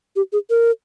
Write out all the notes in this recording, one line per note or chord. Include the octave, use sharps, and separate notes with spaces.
G4
G#4
A#4